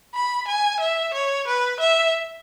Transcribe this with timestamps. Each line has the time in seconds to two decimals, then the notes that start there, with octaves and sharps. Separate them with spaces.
0.15 B5
0.48 G#5
0.80 E5
1.14 C#5
1.47 B4
1.80 E5